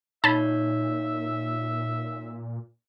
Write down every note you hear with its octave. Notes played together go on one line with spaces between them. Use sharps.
A#2 D#4 C#5 E5 A5 B5